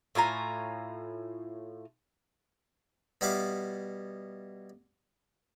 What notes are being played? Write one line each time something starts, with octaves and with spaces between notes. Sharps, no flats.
A2 F4 G#5 A#5
B2 G3 B3 E4 F5 D6